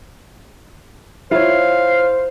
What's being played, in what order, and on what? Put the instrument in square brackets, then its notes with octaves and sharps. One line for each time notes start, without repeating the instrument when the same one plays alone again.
[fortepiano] E4 [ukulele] F4 C#5 [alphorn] C5 [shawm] F5